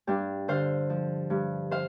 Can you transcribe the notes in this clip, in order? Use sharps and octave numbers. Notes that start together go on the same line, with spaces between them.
G2 D4 G4
D3 C5 F5
F3
G2
C5 F5